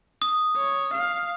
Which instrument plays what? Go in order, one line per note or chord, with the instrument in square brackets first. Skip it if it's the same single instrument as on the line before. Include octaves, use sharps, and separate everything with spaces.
[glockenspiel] D#6
[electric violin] C#5
F5